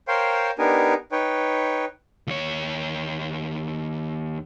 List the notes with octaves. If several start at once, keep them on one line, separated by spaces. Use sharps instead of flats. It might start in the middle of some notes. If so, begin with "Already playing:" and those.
A#4 C5 C#5 F5 G5 C6
B3 D4 D#4 G4 A#4 G#5
D#4 B4 C#5 G5
D#2 C#5